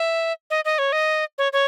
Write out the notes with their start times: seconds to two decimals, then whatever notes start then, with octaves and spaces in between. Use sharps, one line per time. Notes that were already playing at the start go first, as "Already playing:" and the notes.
Already playing: E5
0.50 D#5
0.65 D#5
0.79 C#5
0.92 D#5
1.38 C#5
1.53 C#5